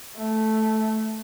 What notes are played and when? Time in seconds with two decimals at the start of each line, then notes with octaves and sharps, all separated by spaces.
0.17 A3